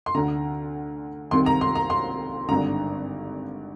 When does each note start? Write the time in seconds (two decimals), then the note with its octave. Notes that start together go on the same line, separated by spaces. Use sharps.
0.06 C6
0.15 D2 D3 A#5
1.31 C2 C3 D#3 C6
1.46 A#5
1.61 C6
1.75 A#5
1.90 C6
2.48 G#1 G2 D3 A#5